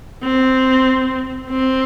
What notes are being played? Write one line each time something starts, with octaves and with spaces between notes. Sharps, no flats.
C4
C4